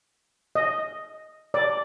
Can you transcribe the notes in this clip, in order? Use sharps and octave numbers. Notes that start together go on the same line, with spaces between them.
D#5
D5